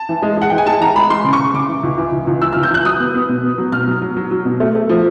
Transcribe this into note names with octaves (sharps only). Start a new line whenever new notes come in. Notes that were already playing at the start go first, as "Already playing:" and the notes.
Already playing: A5
E3
G#3
G#3 F#5
E3 G5
G#5
G#3 A5
E3 A#5
G#3 B5
G#3 C6
C#3
C#6
C#3
C#3 D6
E3
C#2
E3
C#2
C#2
E3 E6
F6
C#2
G6
E3 F#6
F#3 D#6
B3
B3
B2
B3
F#3
B2 F6
F#3
F#3
F#3
F#3
B2
A3
A3
F3